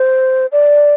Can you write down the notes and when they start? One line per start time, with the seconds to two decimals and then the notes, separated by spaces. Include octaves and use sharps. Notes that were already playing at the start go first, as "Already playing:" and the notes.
Already playing: C5
0.52 D5